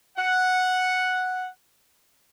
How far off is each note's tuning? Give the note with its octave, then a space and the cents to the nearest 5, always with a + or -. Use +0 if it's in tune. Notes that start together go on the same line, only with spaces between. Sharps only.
F#5 -5